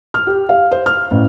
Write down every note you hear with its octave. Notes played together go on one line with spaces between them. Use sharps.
F6
G4
F5
C5
F6
A1